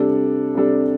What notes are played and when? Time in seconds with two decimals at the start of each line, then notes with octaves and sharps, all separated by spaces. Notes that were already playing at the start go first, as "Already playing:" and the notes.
Already playing: C3 G3 D4 A4
0.55 C3 G3 D4 A4